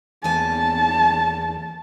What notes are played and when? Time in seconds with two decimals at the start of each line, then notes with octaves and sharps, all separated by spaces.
0.24 E2 A#3 G#5 A5